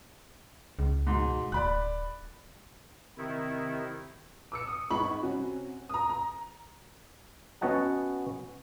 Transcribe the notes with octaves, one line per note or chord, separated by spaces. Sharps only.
C#2
G#2 B2
D1 D5 B5 F#6
C3 D#3 E4
D6 E6 C#7
D#6
G#1 G#2 B3 B5 C#6 F#7
C3 C4 C#4 F#4
A#5 D#6
A#5
B3 C#4 F#4 D#5 F#5 A5